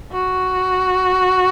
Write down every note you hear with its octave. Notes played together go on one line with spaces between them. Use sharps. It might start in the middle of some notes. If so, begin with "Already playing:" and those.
F#4